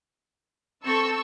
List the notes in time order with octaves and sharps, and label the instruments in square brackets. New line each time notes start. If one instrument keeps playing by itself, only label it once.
[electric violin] C4 A4 [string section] A5 C#6 E6